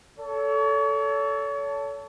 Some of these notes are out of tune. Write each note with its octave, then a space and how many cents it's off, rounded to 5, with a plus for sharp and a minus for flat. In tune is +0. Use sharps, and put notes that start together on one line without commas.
A4 +0 C#5 +35